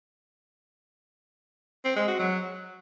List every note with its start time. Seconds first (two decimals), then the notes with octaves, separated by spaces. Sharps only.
1.85 C4
1.96 G#3
2.08 F#4
2.19 F#3